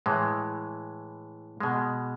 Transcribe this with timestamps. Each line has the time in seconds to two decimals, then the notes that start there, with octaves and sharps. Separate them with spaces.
0.06 A2 E3 G#3
1.60 B2 G#3